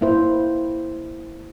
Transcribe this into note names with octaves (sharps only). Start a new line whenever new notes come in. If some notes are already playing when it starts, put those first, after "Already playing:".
A#3 E4 C5